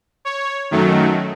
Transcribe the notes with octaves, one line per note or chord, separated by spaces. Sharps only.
C#5
F#2 D#3 F#3 A3